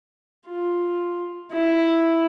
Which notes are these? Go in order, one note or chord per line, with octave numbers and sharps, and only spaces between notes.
F4
E4